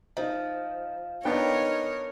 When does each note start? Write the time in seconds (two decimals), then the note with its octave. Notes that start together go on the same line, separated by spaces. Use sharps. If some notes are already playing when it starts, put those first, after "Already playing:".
0.17 F3 D#4
1.25 B3 D4 D#4 A#4 C#5 G5